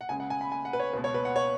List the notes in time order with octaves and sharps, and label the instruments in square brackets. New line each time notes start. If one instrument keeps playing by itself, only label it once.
[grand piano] F#5
C#2 C#3 G#5
F#5
G#5
B5
G#5
F#5
B4
C#5
C#2 B4
B2
C#5
B4
F#5
C#5